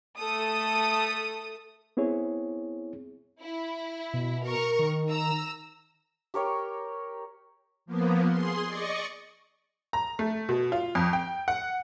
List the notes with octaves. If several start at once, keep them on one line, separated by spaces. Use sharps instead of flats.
A3 A4 D#6
B3 C4 E4 G#4 C#5
E4
B2
A#4 C#6
D#3
A#5 E6
G4 A#4 C#5 G5
F3 A#3 B3
G#4 C6
D5 D#5 C#6
A#5
A3
B2
F4
F2
G5
F#5